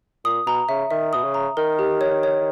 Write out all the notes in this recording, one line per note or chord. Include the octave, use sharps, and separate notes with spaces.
A#2 D#6
B2 A#5
C#3 E5
D#3 E5
B2 D#6
C#3
A#5
D#3 A#4
G4
C#5
C#5